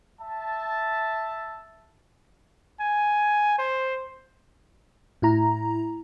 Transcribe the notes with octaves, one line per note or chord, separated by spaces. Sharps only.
E5 A5
G#5
C5
A2 E4 A#5